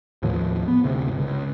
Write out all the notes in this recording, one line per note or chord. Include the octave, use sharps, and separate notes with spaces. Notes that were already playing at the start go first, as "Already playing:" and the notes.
D#2 A2 F3
B3
D2 C3
G1
C#2